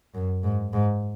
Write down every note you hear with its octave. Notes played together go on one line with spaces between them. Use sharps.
F#2
G#2
G#2